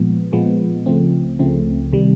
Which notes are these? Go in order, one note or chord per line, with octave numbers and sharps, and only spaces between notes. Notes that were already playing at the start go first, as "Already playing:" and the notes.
Already playing: A#2 F3 G#3 B3
A#2 F3 G#3 B3
C#2 C#3 F3 A3 C4
C#2 C#3 F3 A3 C4
C3 D#3 G3